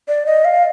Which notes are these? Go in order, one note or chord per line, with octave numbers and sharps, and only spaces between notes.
D5
D#5
F5